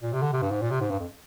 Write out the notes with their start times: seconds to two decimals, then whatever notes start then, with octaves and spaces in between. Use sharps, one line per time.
0.03 A#2
0.13 C3
0.22 D3
0.33 C3
0.42 G2
0.51 G#2
0.61 A#2
0.71 C3
0.81 G#2
0.90 G2
1.00 F2